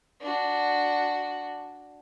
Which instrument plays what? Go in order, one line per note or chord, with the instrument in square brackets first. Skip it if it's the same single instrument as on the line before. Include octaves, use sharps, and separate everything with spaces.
[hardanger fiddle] D4 F#4